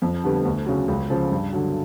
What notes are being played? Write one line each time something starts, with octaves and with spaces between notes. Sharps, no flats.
F2
D3 G3 B3
D2
C#3 F#3
C#2
C#3 F3
G2
D3 F#3